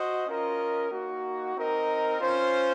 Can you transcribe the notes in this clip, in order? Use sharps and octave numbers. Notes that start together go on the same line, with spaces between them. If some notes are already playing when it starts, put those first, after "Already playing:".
Already playing: F#4 C5 D#5
C#4 F4 A#4 D#5
A#3 D#4 F#4
C4 D#4 A#4 D#5
C#4 F4 C5